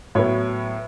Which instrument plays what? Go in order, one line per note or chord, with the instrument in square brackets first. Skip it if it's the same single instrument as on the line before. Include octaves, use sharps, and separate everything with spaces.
[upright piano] A2 F#3 B3 C#5